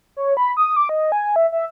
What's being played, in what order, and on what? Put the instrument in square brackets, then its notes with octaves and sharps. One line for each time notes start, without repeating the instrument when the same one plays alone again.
[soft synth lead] C#5
B5
D#6
D6
D#5
G#5
E5
E5